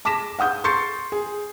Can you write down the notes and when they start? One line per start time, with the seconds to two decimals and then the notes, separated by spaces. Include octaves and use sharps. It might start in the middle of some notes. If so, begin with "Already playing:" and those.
0.05 A5 D6 A#6 B6 E7
0.39 F5 F#5 D#6 G6
0.64 C6 C#6 G6 A6 C7 C#7
1.12 G#4